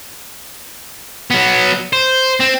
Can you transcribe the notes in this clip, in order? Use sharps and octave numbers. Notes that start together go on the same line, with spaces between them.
F#3 B3
C5
C4